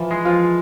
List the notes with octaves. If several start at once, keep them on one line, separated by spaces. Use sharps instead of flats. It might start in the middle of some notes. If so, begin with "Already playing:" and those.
Already playing: E3 F3 F4
G#3
F3 F4